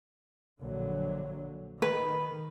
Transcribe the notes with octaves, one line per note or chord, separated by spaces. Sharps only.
A#1 D3 F#3
D#3 B4